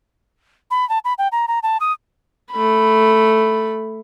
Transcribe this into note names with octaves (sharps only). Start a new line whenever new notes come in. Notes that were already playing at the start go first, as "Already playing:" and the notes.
B5
A5
B5
G5
A#5
A#5
A5
D#6
A3 B5